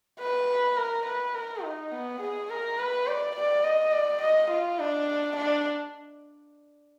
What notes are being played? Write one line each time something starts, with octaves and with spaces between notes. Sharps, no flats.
B4
A#4
B4
A#4
D#4
B3
G#4
A#4
B4
D5
D5
D#5
D5
D#5
F4
D4
D4